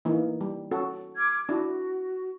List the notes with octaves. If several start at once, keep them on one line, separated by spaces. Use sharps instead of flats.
E3 A#3 D#4
G3
C#4 F#4 A4
D6 F6 G#6
D4 E4 F#4